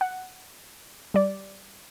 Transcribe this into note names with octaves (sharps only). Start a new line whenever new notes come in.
F#5
G3 D5